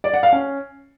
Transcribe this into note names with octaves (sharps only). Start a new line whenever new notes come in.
D5
F#5
F5
C#4